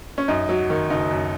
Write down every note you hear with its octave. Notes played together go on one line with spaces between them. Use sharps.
C#4
F#2 D#4
F#3
D#3
F#1 D#4
F#2